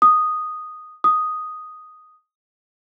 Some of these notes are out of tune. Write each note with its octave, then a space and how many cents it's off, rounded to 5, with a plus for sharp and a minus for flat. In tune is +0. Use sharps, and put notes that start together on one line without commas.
D#6 -5
D#6 +0